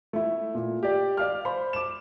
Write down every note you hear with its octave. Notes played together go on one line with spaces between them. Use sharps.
A3 E4
A#2
G4 D5
D5 F5 F6
C5 B5
D6 E7